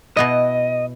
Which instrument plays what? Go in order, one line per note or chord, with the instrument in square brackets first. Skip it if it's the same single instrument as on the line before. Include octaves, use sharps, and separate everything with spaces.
[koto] B2 B3 E4 [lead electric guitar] D#5